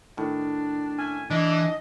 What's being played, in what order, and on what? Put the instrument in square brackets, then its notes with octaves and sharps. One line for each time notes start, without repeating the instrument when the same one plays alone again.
[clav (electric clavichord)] A2 D#3 [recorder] D4
[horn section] C#4 E5 G#5
[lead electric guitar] E3 [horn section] D4 [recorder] D#5